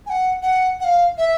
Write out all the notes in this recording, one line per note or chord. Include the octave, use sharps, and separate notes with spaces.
G#5
F#5
F#5
F#5
F5
E5